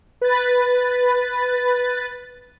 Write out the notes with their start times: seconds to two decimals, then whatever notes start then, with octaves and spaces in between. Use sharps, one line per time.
0.22 B4 A6